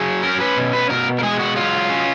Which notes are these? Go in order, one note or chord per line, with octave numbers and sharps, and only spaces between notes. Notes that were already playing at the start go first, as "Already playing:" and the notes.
Already playing: F#3 G#4
C#4 A#4
B4
B2
B4
B2 A#4
A#4
G#3 G#4
F#4
F#3 F4
C#4